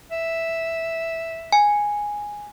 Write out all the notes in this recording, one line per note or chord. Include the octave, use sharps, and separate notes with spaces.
E5
G#5